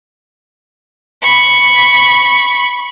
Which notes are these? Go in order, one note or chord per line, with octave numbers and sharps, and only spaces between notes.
B5 C#6